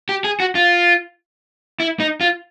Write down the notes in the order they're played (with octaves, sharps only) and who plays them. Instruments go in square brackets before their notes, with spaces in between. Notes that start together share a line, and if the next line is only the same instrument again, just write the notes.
[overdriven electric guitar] G4
G#4
F#4
F4
E4
D#4
F4